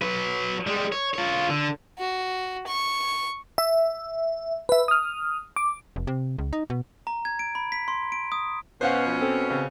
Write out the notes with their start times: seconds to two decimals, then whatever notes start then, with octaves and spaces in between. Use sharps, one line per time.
0.02 F#3 B4
0.67 G3 G#3
0.92 C#5
1.14 F4 C#5
1.50 D3
1.99 F#4
2.67 C#6
3.58 E5
4.69 B4 E5
4.88 D#6 F6
5.56 D6
5.96 F1
6.07 C3
6.38 C#2
6.53 D#4
6.70 B2
7.07 A#5
7.25 G#6
7.39 D7
7.55 B5
7.72 B6
7.88 C6
8.12 D7
8.32 D#6
8.81 B2 C#4 B4 C5 F5 F#5
9.07 F3
9.21 C4 A4
9.50 C#3 C4